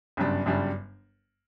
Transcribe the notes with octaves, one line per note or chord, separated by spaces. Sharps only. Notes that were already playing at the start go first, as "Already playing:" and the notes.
G1 F#2 C#3 G3 D4
G1 F#2 C#3 G3 D4